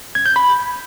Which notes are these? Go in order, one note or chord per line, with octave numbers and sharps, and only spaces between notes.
G#6
G6
B5